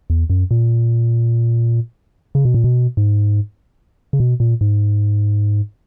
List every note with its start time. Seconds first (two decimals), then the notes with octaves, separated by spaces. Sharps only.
0.10 E2
0.30 F#2
0.51 A#2
2.35 C#3
2.45 B2
2.54 A#2
2.64 B2
2.97 G#2
4.13 C#3
4.20 B2
4.40 A#2
4.61 G#2